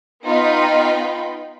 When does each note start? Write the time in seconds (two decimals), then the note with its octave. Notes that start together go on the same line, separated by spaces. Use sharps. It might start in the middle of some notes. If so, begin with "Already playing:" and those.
0.25 B3 D#4 F4 G5 B5